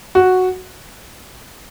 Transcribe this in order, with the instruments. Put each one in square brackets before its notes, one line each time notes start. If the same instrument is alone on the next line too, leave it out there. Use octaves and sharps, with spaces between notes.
[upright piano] F#4